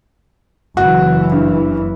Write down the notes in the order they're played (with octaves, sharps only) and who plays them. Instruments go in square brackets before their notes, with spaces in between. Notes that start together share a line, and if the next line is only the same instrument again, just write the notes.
[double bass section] F#1 E3 [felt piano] F#4
[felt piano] G2